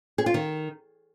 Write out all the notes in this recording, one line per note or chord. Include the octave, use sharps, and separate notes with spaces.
G#4
F4
D#3